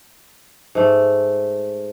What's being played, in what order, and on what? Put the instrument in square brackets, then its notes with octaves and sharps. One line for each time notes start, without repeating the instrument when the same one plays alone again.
[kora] G#2 A3